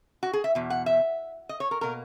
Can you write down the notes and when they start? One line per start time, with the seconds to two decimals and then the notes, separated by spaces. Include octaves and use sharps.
0.23 F#4
0.33 G#4
0.44 E5
0.55 E2 B2
0.70 F#5
0.86 E5
1.49 D#5
1.60 C#5
1.71 A#4
1.81 B2 A#3 A#4